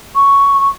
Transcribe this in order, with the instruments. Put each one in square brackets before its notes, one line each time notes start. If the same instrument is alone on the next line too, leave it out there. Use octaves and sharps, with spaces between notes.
[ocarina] C#6